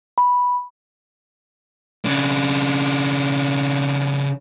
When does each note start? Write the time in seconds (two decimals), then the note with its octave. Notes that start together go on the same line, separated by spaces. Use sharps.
0.18 B5
2.05 C#3 D4